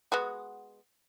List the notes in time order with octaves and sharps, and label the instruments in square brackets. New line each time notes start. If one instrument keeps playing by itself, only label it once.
[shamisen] G#3 B3 F#4